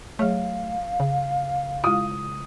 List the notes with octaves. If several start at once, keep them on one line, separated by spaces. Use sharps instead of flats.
F#3 A3 G#4 C#5 F5
C#3
G#3 E4 F4 D#6